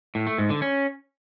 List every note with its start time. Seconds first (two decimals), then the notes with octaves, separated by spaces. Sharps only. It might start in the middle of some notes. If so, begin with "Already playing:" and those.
0.15 A2
0.27 A3
0.38 G#2
0.50 D3
0.62 C#4